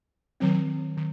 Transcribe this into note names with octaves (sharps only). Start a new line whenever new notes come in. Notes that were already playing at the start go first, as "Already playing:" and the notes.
D#3 F#3 C4
D#3